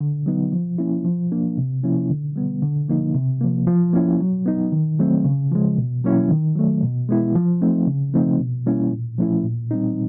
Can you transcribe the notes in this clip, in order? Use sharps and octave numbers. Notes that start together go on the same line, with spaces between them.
D3
F#3 B3 D#4
F3
A#3 C#4 E4
F3
A#3 D4
C3
F3 A#3 C#4 E4
D3
G3 B3
D3
F3 A#3 D#4
C3
F3 A#3
F3
A#3 C#4 E4
F#3
B3 D#4
D#3
F#3 A3 C4
C#3
F3 G#3
B2
F#3 A#3 C#4 E4
D#3
F#3 A3
B2
G#3 B3 E4
F3
A3 C4 D#4
C#3
F3 A3 C4 D#4
B2
G3 A#3 C#4 E4
A#2
F3 A3 C#4 E4
A#2
G3 C4 D#4